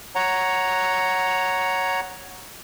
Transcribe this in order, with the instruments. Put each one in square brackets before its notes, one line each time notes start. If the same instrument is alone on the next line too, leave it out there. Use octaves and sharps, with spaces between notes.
[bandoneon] C#5 F#5 A#5